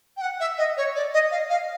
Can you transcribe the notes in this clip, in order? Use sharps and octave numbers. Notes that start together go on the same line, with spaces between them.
G5
F#5
E5
D#5
C#5
D5
D#5
F5
F5